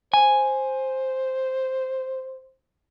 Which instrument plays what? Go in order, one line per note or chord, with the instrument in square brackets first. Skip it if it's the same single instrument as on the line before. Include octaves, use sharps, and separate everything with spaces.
[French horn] C5 [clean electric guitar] G#5